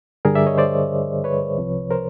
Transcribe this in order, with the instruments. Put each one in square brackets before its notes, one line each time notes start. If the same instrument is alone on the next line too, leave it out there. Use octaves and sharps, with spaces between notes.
[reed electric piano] G2 D3 G3 G#4 A#4
D5 E5
C#5 D#5
C5 D5
B4 C#5
C2 C3 F3
A#4 C5